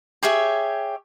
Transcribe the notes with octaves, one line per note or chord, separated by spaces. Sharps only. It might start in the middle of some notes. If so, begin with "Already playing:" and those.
G4 G#4 C#5 E5